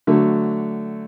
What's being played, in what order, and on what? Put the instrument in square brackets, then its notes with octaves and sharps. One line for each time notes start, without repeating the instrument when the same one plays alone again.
[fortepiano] D3 F#3 A3